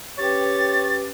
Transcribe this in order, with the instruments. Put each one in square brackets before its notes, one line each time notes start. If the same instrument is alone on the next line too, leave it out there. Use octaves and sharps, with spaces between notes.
[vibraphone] C#4 B4 G5 [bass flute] G4 [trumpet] C#5 [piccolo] A6